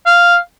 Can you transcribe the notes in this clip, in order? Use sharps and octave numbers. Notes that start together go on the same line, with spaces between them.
F5